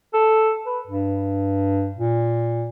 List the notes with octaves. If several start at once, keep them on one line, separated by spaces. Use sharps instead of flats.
A4
B4
G2
A#2